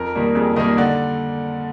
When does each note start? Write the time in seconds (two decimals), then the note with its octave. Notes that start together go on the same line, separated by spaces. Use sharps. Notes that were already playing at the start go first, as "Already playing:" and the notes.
Already playing: F2 A#4
0.15 D#3 G3 A#3
0.35 F2 G#4
0.56 D#3 G3 A#3 D#5
0.78 D3 D5